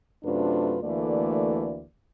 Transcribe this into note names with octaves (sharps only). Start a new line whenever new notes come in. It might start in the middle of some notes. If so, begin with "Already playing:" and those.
F#2 C3 A3 D4 F4 B4
D2 E3 A3 A#3 D5